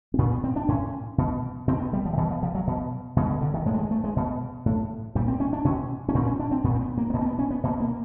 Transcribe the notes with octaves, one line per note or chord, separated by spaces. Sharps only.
C4
A#2 B3
B3
C4
D4
A2 C#4
B2
B2 C4
B3
G3
F3
D#3
B2 E3
F3
F3
F#3
B2
B2 G#3
D3
D3
D#3
A2 G#3
G3
G#3
A3
G#3
B2
A2
A#2 G3
C4
C#4
D4
B2 C#4
C#4
A#2 C4
C#4
D4
C4
A#2 B3
C4
B3
A#3
B3
B2 A#3
C4
B3
C#4
B3
B2 A#3
A#3